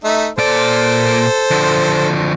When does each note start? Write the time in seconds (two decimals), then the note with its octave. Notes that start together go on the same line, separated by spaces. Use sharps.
0.04 A3 D#4 E5
0.38 A#2 A4 C5 D5
1.51 D3 F3